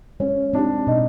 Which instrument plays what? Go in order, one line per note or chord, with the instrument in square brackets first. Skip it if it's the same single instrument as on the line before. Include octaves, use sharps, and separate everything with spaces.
[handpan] G#3 [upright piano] C#4
[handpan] C4 D#4 G4 [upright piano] D4
[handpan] B2 [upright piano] D#4